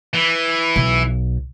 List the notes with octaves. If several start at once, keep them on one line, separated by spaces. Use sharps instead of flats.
E3
B1